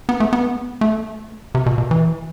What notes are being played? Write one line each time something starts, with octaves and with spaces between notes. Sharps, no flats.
B3
A3
B3
A3
C3
B2
B2
E3